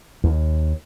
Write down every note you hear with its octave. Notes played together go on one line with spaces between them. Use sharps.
D#2